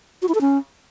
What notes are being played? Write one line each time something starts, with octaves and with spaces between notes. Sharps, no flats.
F#4
E4
A4
C#4